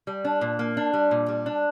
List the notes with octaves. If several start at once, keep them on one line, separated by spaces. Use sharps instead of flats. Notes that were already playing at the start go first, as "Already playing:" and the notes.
G3
D4
A#2
A#3
D4
G3
A#2
G3
D4